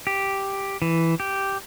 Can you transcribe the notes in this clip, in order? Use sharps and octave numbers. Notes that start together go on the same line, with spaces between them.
G4
E3
G4